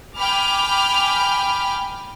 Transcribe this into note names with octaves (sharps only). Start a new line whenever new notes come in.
G5 G#5 B5 D6 F6